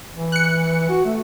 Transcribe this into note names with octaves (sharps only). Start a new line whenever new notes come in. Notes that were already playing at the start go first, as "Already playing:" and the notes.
E3
F#6 C#7
F#4
A3